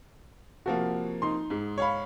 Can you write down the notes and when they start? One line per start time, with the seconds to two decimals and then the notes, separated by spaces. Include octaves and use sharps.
0.66 C3 F3 A#3 F#4
1.22 D#4 C6
1.50 G#2
1.78 C#5 F5 B5